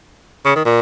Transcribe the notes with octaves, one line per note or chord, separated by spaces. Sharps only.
C#3
D#3
A#2